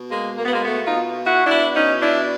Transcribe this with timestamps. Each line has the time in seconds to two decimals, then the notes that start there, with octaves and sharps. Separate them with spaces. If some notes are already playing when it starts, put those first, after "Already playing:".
Already playing: B2
0.09 G#3 A#3
0.37 A#3
0.44 B3
0.51 G#3 A#3
0.65 A3 B3
0.85 D#4 F4
1.26 E4 F#4
1.47 B2 D4 E4
1.75 C#4 D#4
2.02 D4 E4